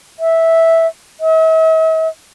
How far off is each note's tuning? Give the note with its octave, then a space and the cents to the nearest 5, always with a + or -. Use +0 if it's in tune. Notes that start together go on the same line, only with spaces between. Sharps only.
E5 -10
E5 -45